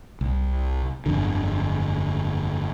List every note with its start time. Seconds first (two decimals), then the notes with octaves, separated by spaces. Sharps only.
0.21 C2
1.06 G1 F2 D3